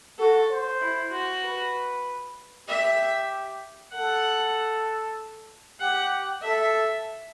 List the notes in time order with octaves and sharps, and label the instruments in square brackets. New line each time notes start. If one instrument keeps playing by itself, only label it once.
[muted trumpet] F#4 [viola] A4
[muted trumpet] C5
[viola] E4
F#4
[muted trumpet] B4
[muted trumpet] G4 [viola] E5
[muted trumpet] A4 [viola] F#5
[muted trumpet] G4 [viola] F#5
[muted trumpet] A4 [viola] E5